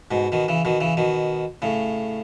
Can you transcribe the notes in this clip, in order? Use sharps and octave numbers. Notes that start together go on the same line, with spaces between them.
G#2 B2
B2 D#3
C#3 E3
B2 D#3
C#3 E3
B2 D#3
A2 C#3